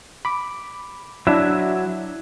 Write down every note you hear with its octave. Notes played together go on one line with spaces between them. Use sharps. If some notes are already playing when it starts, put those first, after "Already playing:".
B5 D6
F#3 D4 E4 E5